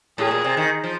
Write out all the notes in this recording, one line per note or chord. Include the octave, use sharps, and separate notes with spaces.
A2 G#4
A#2
C3
D#3
F3